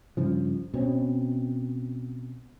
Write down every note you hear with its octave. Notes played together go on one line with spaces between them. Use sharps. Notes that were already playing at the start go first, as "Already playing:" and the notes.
G2 C#3 F3
B2 C4 C#4